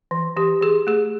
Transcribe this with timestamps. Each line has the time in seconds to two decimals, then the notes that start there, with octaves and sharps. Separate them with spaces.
0.11 E3
0.36 E3 G4
0.62 E3 G#4
0.87 A3 G#4